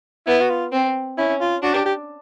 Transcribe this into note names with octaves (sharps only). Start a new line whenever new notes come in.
B3 E4
F#4
F4
C4
C#4 E4
F4
D4 F#4
G4
G4